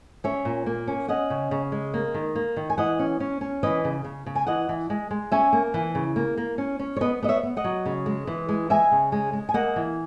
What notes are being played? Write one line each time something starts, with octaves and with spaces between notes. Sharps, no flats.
C#4 C#5 E5
A#2
A#3
C#4
C#4 D#5 F#5
C#3
C#3
G#3
A#3
D#3
A#3
D#3
G#5
E3 D#5 F#5
C#4
C#4
C#4
E3 B4 D#5
C#3
C#3
C#3
G#5
E3 D#5 F#5
E3
G#3
G#3
C#4 E5 G#5
A#3
E3
C#3
A#3
A#3
C#4
C#4
C#5
B3 B4 D#5
B3 D#5
C#5 E5
B3
D#5 F#5
F#3
C#3
G#3
E3
G#3
G#3 E5 G#5
C#3
G#3
G#3
G#5
A#3 D#5 F#5
E3